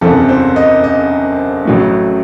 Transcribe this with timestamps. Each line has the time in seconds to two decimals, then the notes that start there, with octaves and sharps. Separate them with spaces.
0.01 F#1 E2 C3 A4
0.29 C5
0.56 D#5
0.84 D#5
1.65 A1 A2 F#3 A3